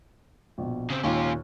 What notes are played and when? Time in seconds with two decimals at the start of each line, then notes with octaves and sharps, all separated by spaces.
0.58 A#1 B2
0.90 C#3 C4
1.03 D#2 A#2 C#4 F4